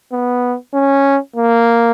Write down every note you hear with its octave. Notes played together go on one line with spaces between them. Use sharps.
B3
C#4
A#3